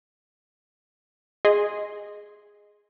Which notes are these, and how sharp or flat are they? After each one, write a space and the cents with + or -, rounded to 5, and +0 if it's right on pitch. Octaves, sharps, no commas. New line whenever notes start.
G#4 +0 D#5 +0 C6 +5